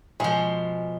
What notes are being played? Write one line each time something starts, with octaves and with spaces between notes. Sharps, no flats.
B2 F3 G#3